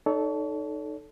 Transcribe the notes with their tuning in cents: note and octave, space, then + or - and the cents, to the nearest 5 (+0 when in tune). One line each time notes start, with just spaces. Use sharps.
D#4 -15 A4 -10 C#5 +35